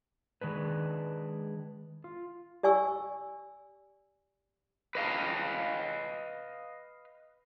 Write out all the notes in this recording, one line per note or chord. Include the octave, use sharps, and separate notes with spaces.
D#3 G#3 D4 B4
F4
G4 D5 G#5 C#6 E6
B4 D#5 F5